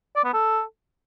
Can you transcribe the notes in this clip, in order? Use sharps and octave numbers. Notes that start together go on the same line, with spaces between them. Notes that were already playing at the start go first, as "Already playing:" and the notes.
D5
B3
A4